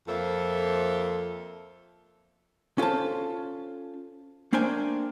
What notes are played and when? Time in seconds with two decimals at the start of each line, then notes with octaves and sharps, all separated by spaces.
0.08 F2 A#3 A4 C5 E5
2.78 C#4 F4 A4 C5 A5
4.53 A3 A#3 D4 C5 G5 G#5